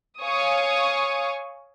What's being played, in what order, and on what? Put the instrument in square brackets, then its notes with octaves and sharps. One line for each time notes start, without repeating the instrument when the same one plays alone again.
[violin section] C#5 F5 G#5 C#6 D#6